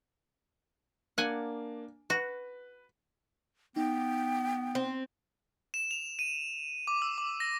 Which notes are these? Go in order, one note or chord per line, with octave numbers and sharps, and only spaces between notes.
A#3 D4 F#5 G#5
F#4 B4
B3 D#4 G5
C4
E7
F7
D#7
D6
E6
D6
A#6